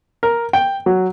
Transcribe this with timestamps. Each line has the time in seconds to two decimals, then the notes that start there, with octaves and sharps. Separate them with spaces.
0.23 A#4
0.53 G5
0.86 F#3